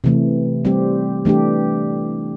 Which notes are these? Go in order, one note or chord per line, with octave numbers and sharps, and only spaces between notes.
C3 E3 A3
G3 C4 G4
E3 A3 D4 G4